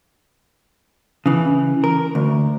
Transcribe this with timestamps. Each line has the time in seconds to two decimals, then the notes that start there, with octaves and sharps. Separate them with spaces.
1.26 C#3 E3
1.84 A#4
2.15 D2